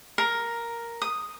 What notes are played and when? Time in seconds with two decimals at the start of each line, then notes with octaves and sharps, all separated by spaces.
0.18 A#4
1.02 D#6